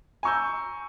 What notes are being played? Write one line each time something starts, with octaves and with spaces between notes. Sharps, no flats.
G#5 A#5 C#6 E6 G6